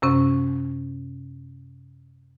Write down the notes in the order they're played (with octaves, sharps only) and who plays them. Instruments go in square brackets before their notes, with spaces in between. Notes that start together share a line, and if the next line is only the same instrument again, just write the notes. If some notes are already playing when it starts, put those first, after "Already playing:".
[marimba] F#2 C3 C#4